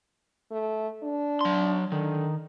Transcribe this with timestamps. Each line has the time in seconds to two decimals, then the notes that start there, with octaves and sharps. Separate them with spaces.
0.51 A3
1.03 D4
1.41 F#3 C6
1.92 D3 D#3